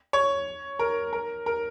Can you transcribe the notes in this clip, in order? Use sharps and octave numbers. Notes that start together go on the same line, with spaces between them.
C#5
A#4
A#4
A#4